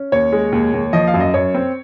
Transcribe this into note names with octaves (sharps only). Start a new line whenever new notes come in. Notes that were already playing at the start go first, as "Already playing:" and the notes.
Already playing: C#4
D#2 C#5
G#3
D#2
D#2
F3 D#5
F5
F#2
D#5
F#2 C#5
C4